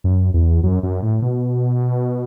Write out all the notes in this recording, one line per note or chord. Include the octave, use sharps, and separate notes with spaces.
F#2
E2
F#2
F#2
A2
B2